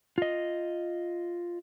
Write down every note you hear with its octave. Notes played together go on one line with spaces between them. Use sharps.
F4 D#5